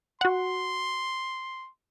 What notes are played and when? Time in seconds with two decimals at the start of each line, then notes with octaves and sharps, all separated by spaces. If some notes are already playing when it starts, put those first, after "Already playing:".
0.21 F#4 F#5 C6